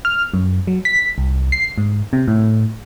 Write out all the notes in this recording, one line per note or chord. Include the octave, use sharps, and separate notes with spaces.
F6
F#2
F#3
B6
C2
C7
G#2
C3
A2